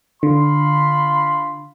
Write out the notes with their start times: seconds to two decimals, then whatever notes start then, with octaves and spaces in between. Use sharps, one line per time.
0.23 D3 F4 B5 C6